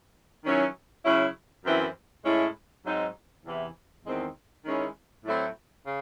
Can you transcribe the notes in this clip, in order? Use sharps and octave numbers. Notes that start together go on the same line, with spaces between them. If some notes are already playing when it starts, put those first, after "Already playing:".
D#3 F#3 C#4 E4
C#3 F#3 C#4 E4
F#2 E3 C4 E4
A2 G#3 C#4 E4
G#2 F#3 C4 D#4
E2 C3 E3
E2 D#3 G#3 C4
D#3 G#3 C#4 E4
A2 F#3 A3 C4 E4
C#3